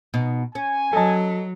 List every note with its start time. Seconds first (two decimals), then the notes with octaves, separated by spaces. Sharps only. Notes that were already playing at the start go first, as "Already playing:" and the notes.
0.14 B2 D#4
0.55 C#4 G#5
0.93 F#3 A4 D#5 A5